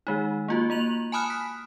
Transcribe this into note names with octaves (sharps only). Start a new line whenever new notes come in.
D#3 G#3 D#4
A#3 F4 F#4
A#3 A#5 F7 F#7
G#5 A5 B5 D#6 F6 F#6
B6